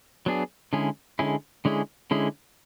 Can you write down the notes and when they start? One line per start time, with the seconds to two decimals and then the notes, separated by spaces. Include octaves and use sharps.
0.26 F#3 B3 D4 G#4
0.73 D3 G#3 C#4 E4 G#4
1.19 D3 G#3 C#4 E4 G#4
1.65 D3 G#3 C#4 E4 G#4
2.11 D3 G#3 C#4 E4 G#4